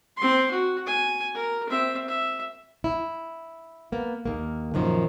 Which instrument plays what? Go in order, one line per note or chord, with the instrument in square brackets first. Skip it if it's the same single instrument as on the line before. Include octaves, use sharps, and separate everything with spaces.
[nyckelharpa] C4 C6
F#4
G#5
A#4
C4 E5
E5
[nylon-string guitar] E4
A#3 B3
D#2 A#3
F#2 A#2 D#3 F3